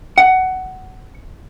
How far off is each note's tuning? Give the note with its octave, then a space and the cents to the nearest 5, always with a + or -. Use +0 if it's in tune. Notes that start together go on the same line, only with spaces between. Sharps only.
F#5 +15